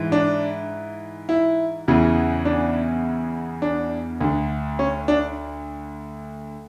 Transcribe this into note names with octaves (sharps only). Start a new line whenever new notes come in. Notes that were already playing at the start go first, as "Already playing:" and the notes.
Already playing: G#2 E3
D4
E4
E2 C#3 E3
D4
D4
D2 D3
C#4
D4